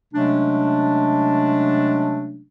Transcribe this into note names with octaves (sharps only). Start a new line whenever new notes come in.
C3 F#3 G#3 A3 C#4 D4